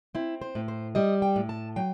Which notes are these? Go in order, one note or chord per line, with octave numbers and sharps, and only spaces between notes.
C4 E4
C5
A2
C5
G3 D#5
G5
A2
A5
F#3 G5